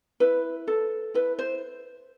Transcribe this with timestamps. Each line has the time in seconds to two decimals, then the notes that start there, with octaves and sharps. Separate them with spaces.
0.20 E4 B4
0.67 A4
1.14 E4 B4
1.39 C5